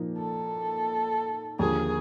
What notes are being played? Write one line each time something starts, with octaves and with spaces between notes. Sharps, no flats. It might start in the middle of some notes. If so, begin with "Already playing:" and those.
Already playing: A#2 F3 A#3 D#4
A4
D#2 D3 F3 A#3 G#4